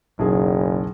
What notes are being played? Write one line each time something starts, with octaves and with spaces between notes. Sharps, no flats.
F#1 B1 G#4